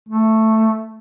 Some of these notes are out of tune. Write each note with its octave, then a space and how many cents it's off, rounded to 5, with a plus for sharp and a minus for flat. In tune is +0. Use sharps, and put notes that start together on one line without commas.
A3 +5